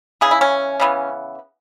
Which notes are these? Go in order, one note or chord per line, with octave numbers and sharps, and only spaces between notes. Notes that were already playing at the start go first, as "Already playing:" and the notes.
C#3 E3 B3 G#4
E4
C#4
C#3 E3 B3